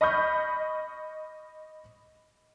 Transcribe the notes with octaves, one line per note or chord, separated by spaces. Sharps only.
D#5 B5 C#6 F6 G6